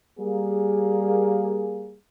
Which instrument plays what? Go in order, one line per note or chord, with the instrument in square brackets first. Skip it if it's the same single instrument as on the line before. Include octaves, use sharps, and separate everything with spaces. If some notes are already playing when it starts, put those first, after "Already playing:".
[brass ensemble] G3 A#3 G#4